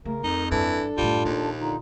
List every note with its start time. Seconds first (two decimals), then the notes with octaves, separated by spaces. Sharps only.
0.05 C#3 A3 A#4
0.24 F2 A3 D#4
0.51 G2 E3 D4 A4
0.98 F#2 A2 G3 F4
1.25 A#1 D#2
1.61 D3 D#4 F4